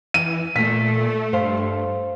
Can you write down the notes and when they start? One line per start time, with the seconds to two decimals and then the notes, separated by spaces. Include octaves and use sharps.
0.14 E3 D#7
0.56 A#2 A3 B6
1.33 G2 C5 F5